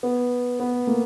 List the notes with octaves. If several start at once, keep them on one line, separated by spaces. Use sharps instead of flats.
B3
B3
A#3